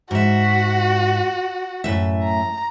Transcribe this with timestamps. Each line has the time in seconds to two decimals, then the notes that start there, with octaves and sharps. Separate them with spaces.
0.11 G#2 F#4 E5
1.84 F#2 A2 E5
2.24 A#5